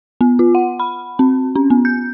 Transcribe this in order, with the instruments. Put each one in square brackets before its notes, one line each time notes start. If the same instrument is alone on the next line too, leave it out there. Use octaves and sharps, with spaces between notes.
[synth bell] B3
F4
F#5
B5
C4
C#4
B3
G6